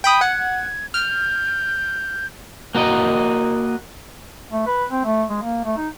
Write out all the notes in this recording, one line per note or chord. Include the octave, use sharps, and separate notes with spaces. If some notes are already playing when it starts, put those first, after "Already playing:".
G5 B5 D#6
F#5 G#6
F6 G6
A#3 F#4 A#4 D#5
A3
B4
C4
A3
G#3
A#3
A3
D#4